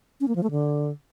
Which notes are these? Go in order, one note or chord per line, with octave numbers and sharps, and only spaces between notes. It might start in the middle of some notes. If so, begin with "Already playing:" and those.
C#4
A#3
F3
A3
D3